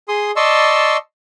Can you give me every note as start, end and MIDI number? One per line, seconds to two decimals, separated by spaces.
0.08 0.31 68
0.08 0.31 84
0.08 0.31 87
0.36 0.97 74
0.36 0.97 75
0.36 0.97 81
0.36 0.97 84
0.36 0.97 85
0.36 0.97 88